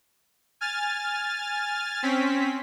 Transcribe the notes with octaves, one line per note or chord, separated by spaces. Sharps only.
G#5 F6 A6
C4 C#4 B6